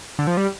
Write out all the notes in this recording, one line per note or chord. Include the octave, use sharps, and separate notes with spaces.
D3
F3
G3